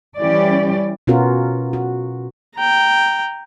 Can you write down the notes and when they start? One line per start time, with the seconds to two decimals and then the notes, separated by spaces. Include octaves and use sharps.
0.19 E3 G3 C#4 G4 D5
1.07 B2 B3 C#4 F4 F#4 A#4
1.73 F#4
2.55 G5 A#5